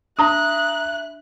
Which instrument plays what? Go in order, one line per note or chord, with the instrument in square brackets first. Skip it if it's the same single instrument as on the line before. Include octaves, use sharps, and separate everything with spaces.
[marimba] D4 [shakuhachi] E5 [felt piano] A#5 D#6 [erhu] F#6